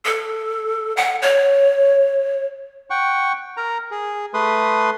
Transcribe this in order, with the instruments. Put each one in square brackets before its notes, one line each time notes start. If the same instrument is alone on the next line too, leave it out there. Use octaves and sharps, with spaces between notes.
[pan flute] A4
F#5
C#5
[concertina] F#5 G5 C#6
A#4 A#5
G#4
A3 B4 C6 D#6